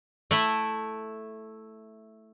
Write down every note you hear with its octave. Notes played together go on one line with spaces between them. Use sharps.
A3 E4